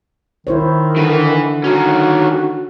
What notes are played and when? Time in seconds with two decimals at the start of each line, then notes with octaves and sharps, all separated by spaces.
0.47 D#3 E4 C5 C#5
0.97 D3 E3 B4
1.64 D#3 C#4 F#4